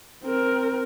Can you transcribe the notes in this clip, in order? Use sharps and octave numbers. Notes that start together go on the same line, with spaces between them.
C4 A#4